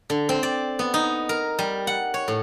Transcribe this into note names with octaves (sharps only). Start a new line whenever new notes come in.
D3
C4
D5
B3
D#4
A#4
G3
F#5
C#5
A2